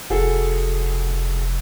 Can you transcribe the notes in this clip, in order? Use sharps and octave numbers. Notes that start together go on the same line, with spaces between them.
F1 F#4 G#4 A4